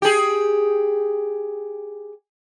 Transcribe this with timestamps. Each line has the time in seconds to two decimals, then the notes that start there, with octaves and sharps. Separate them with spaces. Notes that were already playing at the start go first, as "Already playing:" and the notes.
0.02 G4 G#4